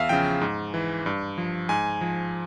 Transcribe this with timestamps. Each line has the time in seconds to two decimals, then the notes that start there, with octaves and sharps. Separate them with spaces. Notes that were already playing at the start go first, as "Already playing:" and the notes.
Already playing: E2 E5 F5
0.09 C#3 F3 G5
0.41 G#2
0.74 E3
1.06 G2
1.38 F3
1.69 G#2 G#5
2.01 F3